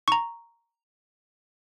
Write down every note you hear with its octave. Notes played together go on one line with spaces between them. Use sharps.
A#5 C#6